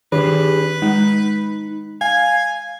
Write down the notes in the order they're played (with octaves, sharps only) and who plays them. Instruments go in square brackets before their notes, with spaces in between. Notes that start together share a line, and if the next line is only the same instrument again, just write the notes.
[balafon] D#3 [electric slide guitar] D4 G4 G#4 [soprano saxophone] B4
[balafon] G#3 [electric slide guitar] D#4
[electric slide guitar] F5 [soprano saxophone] G#5